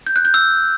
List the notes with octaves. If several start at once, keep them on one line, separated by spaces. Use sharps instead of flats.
G6
F#6
G6
E6